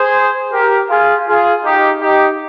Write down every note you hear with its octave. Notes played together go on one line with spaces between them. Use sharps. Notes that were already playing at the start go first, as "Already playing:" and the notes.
Already playing: G#4 C5
G4 A#4
F4 G#4
F4 G#4
D#4 G4
D#4 G4